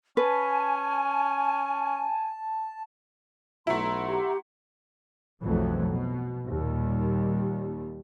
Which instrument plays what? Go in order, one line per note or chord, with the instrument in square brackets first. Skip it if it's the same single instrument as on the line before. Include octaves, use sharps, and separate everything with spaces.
[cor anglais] C#4 [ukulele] B4 [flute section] G#5 [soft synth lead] A5
[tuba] B1 [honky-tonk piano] A3 E4 [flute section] F#5 A#5 C6
[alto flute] G4
[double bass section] B1 F2 G#2 E3 F#3 A3
B2
D#2 A#2 G3